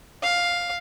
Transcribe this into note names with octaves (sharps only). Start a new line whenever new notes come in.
F5